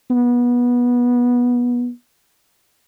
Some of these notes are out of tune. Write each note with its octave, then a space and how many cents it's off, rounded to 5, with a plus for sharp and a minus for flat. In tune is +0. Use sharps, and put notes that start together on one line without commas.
B3 -20